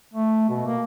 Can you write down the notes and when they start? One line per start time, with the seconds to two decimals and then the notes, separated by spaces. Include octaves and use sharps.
0.14 A3
0.49 B2
0.66 A#3